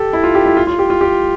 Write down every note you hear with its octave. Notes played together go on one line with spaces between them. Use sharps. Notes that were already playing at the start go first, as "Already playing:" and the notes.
Already playing: G4 A4
E4
F4
G4
E4
F4
F4
G4
F4
G4